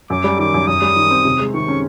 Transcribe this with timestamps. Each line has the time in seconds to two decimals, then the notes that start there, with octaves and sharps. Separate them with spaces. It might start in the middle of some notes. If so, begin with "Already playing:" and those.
0.10 F#2 D6
0.24 G3
0.39 D#3 D6
0.54 F#2
0.67 F#2 D#6
0.82 G3
0.96 D#3
1.11 C4
1.25 C3
1.39 G#3
1.54 D#3 C#6
1.68 C#4